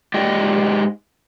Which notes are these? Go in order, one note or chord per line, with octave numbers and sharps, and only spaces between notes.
G#2 G4 D5 D#5 G5